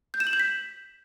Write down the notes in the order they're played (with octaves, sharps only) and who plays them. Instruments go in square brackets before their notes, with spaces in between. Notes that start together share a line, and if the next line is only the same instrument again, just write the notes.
[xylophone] G6
E7
F#7
G6
B6